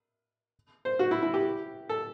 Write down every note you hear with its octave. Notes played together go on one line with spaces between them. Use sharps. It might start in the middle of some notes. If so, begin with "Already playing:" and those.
C5
F#4
E4
E4
G4
A4